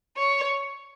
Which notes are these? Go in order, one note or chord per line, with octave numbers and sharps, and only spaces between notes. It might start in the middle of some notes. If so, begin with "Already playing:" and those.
C#5